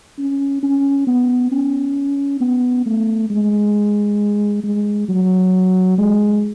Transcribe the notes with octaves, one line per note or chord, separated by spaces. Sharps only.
C#4
C#4
B3
C#4
B3
A3
G#3
G#3
F#3
G#3